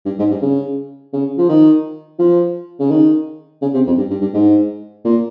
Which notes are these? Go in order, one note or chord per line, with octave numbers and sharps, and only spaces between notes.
G2
G#2
G2
C#3
C#3
F3
D#3
F3
C#3
D#3
C#3
C3
F2
G2
G2
G2
G#2
A#2